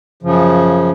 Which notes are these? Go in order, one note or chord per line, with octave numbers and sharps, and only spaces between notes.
F#2 C#3 F3